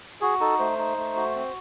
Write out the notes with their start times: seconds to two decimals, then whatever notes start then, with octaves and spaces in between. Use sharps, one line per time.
0.21 F#4 G#4
0.40 D#4 A4
0.59 A3 C5
0.78 D#4
0.97 A3
1.16 F#4
1.35 C4